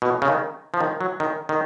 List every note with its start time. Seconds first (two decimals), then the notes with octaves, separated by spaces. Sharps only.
0.02 B2
0.22 C#3
0.28 D#3
0.74 F3
0.81 D#3
1.01 F#3
1.20 D#3
1.49 D#3